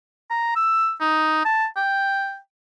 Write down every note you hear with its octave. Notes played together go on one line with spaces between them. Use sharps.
A#5
E6
D#4
A5
G5